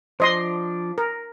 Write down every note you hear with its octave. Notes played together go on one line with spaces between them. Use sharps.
F3 D4 C5 D#5 C6
A#4